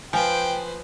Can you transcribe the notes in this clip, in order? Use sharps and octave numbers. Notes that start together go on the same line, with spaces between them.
F3 B4 C5 G5 G#5